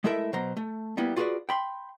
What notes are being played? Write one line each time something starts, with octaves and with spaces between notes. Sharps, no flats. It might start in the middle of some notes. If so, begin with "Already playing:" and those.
G#3 A3 E4 A4 A#4 E5
B2 F#3 C5 A#5
A3
G3 A#3 B3 E4
F4 F#4 G#4 A#4 B4 D5
G5 B5 C6